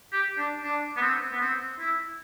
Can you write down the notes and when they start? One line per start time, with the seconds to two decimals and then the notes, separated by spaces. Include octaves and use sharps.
0.13 G4
0.38 D4
0.64 D4
0.97 B3
1.02 C4
1.32 B3
1.41 C4
1.79 E4